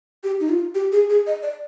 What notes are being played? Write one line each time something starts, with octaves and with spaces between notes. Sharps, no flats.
G4
D#4
F4
G4
G#4
G#4
D#5
D5